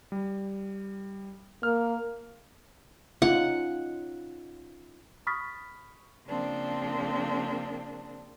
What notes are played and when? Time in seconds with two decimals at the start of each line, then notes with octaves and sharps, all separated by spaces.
0.12 G3
1.63 A#3 F6
3.22 C#4 D#4 F4 F#5
5.27 B5 C#6 D#6 F6 A6 B6
6.27 C#3 F3 A#3 C4 D4